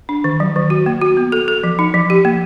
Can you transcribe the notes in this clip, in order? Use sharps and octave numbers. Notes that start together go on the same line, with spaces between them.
D4
D#3
F#3
D#3
F#4
A#3
F#4
B3
A4
A4
F3
D#4
F3
G4
A#3